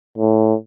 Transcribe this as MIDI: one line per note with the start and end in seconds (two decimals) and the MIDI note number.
0.18 0.54 45